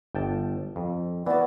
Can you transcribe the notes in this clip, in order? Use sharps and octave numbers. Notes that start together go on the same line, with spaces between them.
G1 G5 A5
F2
E3 B3 F#4 D5